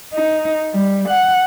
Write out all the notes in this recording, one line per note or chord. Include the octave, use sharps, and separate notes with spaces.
D#4
G3
F#5